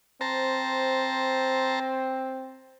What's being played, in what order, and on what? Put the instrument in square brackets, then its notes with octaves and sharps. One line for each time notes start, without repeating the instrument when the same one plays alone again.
[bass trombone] C4 [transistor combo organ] C5 A5 A#5